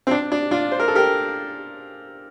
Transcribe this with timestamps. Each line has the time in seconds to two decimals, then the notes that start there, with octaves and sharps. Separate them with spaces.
0.07 C4
0.11 D4
0.32 D4
0.51 D4 F4
0.72 C5
0.79 A#4
0.88 A4
0.95 G4 A#4